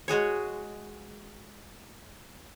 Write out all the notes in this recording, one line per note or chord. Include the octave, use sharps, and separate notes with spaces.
G#3 F#4 G#4 C#5